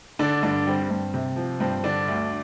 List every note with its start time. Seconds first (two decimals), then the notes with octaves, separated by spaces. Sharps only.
0.19 D3 D4
0.43 G2 D4
0.66 G3 C4
0.90 G2
1.14 C3
1.36 F3
1.60 G2 C4
1.83 D3 D4
2.08 D2